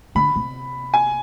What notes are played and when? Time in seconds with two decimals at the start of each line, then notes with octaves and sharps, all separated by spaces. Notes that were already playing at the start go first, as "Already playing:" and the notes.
0.15 D3 B5
0.36 C3
0.94 G#5